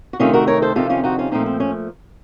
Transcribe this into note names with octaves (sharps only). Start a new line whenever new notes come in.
F#4
C3 D#3 A3 C#4 F4
F#4 A#4
A#4 C#5
A4 C5
F2 C3 D#3 F4 A4
C#4 F4
D#4 F#4
C#4 F4
A#2 F3 A3 C4 D#4
C4
C#4